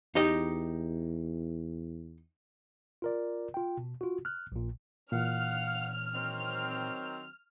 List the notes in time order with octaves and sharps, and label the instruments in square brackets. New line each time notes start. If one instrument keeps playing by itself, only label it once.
[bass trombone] E2 [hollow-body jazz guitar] D#4 G4 D#5
[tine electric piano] F4 A#4 D5
F4 G5
B2
F4 F#4
F6 F#6
A#1 A#2
[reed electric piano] A#2 E3 [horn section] F5 F#5 [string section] F6
[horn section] D#3 F#3 C4